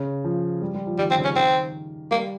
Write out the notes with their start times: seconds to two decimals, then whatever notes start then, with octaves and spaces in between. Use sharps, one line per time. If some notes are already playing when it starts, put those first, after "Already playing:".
Already playing: C#3
0.25 F3
0.62 G3
0.74 G3
0.87 F3
0.99 D#3 G3
1.11 C4
1.18 C#3
1.24 C#4
1.36 D#3 C4
2.11 G3 A#3